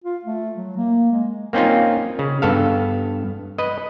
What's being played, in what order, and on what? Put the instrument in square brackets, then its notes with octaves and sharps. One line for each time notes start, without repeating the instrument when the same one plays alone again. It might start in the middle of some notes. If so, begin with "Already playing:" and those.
[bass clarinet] F4
A3
F#3
A#3
G#3
[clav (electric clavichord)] A#3 C4 C#4 D#4 F4
C#3
G2 B3 A4 F5
B4 D#5